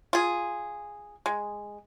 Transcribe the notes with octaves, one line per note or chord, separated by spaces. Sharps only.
F4 G#4
G#3